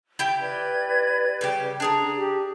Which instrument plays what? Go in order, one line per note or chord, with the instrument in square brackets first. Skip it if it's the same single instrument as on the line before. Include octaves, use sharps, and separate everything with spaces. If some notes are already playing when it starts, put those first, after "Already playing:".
[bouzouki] E4 G4 G5
[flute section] B4 D5 G#6
[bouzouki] C#3 G3 G4
D4 G#4 A#5
[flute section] G4